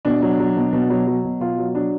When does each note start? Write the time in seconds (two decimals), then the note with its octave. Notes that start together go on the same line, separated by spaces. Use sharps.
0.05 B2 D4
0.22 F#3
0.39 F#3
0.57 B2
0.73 B2
0.90 F#3
1.07 F#3
1.24 B2
1.40 B2 F4
1.58 F#3
1.75 F#3 D4